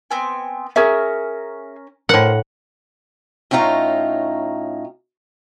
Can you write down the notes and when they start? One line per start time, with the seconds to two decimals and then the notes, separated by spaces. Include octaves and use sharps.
0.11 B3 C4 G#5
0.76 C#4 G#4 A#4 E5
2.09 A2 A#4 C5 F#5
3.51 A2 C#4 D#4 F4 A#5